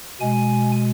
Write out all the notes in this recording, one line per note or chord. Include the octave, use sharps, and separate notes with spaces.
B2 G#3 G#5